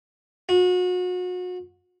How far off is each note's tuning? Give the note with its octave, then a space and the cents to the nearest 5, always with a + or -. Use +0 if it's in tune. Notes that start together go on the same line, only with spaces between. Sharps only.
F#4 -35